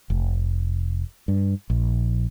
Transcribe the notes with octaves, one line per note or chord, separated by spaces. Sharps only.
F1
G2
A#1